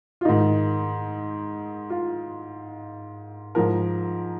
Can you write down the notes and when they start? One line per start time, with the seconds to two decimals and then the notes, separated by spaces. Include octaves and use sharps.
0.21 F4
0.25 G#2 D#3 D#4
1.90 F4
3.55 G#2 F3 A#4